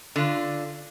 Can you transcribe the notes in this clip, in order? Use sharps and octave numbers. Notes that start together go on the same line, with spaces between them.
D3 F4